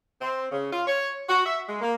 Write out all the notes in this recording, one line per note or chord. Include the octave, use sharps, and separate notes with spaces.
C4
C#3
F4
C#5
F#4
E5
G#3
A#3